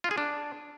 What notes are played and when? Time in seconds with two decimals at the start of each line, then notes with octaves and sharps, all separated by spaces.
0.04 F4
0.11 G#4
0.18 D4